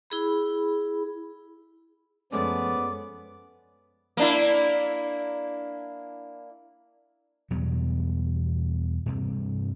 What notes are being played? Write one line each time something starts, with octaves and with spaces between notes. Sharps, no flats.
E4 G#4 B5
F#2 F3 G#3 A3 B3 C#4 D5
A#3 D4 E4
E2 B2 F#3 G3
G2 C3